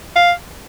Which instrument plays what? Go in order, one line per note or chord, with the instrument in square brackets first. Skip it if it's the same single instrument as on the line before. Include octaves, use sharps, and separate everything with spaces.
[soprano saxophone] F5